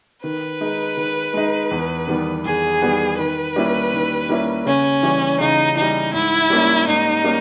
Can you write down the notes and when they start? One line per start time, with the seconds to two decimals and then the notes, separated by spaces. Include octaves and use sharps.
0.23 D#3 B4
0.61 G#3 D#4
0.97 D#3
1.34 G#3 D#4
1.71 E2
2.07 D#3 G3 B3
2.46 E2 G#4
2.82 D#3 G3 B3
3.18 D#3 B4
3.56 G3 A#3 C#4 E4
3.93 D#3
4.29 G3 A#3 C#4 E4
4.66 C#3 C#4
5.03 E3 G3
5.40 C#3 D#4
5.77 E3 G3 D#4
6.13 G#2 E4
6.50 G3 A#3 C#4
6.87 G#2 D#4
7.24 G3 A#3 C#4